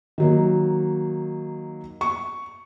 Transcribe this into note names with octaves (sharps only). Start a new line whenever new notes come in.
D#3 F#3 A#3
C#6